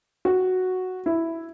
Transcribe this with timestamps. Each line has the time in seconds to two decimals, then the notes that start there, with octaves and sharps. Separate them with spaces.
0.25 F#4
1.06 E4